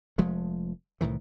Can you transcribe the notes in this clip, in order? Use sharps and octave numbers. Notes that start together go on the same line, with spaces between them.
F1 F3 G#3 A3
C2 A2 D#3 E3